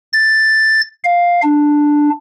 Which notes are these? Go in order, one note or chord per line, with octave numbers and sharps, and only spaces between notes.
A6
F5
D4